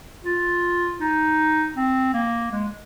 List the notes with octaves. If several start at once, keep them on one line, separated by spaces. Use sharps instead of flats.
F4
D#4
C4
A#3
G#3